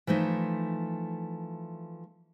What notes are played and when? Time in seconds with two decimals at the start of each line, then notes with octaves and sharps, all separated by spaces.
0.07 E3 F3 A3 D#4